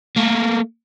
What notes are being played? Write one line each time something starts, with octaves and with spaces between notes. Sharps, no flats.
A3 A#3